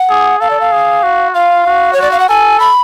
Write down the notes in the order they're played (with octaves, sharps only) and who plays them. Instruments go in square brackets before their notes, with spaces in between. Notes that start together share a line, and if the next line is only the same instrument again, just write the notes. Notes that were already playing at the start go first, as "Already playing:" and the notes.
Already playing: [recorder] F#5
[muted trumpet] G#4
[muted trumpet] A4 [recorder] F5
[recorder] D5
F5
[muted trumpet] G#4
F#4
[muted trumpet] F4 [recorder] F5
[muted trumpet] F#4
[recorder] C#5
[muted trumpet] F#4 [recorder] D5
[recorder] F5
F#5
[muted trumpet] A4 [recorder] G#5
[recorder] B5